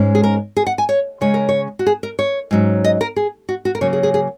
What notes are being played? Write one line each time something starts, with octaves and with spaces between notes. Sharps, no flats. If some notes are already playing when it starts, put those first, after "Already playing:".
Already playing: G#2 G#3 C#4
G#4
A#4
G#4
F#5
G#5
C#5
C#3 G#3 C#4 C#5
A#4
C#5
F#4
G#4
A#4
C#5
G#2 F#3 C#4
D#5
A#4
G#4
F#4
F#4
A#4
C#3 F#3 A#3 C#4 C#5
G#4
G#4
G#4